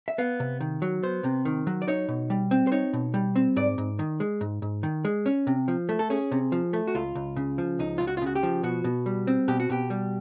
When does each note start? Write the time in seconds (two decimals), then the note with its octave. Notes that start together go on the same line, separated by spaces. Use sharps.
0.08 E5
0.18 B3 F5
0.40 C3
0.60 D#3
0.82 F#3
1.03 B3 C5
1.24 C3
1.45 D#3
1.67 F#3
1.82 D5
1.88 D#4 C#5
2.08 B2
2.30 G3
2.51 C4
2.67 C5
2.72 D#4 C#5
2.93 B2
3.14 G3
3.36 C4
3.56 G#2 D5
3.78 G#2
3.99 D#3
4.20 G#3
4.41 G#2
4.62 G#2
4.83 D#3
5.05 G#3
5.26 C#4
5.47 C3
5.68 F3
5.89 A3
5.99 A4
6.10 C#4 G#4
6.32 C3
6.52 F3
6.73 A3
6.87 F#4
6.95 C#2 F4
7.15 C#2
7.36 C#3
7.58 F3
7.79 C#2 D#4
7.98 C#2 F4
8.07 F#4
8.17 F4
8.22 C#3 F#4
8.35 G4
8.43 F3
8.63 B2 F#4
8.84 B2
9.06 G3
9.27 C4
9.48 B2 G4
9.60 F#4
9.70 B2 G4
9.90 G3